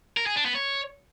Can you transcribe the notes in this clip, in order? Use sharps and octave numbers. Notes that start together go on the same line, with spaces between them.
A#4
G#4
D4
B3
C#5